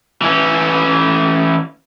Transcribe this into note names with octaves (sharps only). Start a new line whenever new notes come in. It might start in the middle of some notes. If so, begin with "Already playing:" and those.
E3 C#4